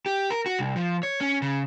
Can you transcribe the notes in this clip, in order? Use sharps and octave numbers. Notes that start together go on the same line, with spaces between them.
G4
A#4
F#4
C2
F3
C#5
C#4
C#3